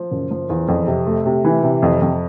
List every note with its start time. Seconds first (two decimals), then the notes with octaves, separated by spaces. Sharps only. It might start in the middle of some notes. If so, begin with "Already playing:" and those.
Already playing: F3
0.11 F#1
0.31 F3
0.49 E2
0.68 F2
0.87 C3
1.07 A3
1.26 C3
1.45 E3
1.63 C3
1.82 F2
2.02 F2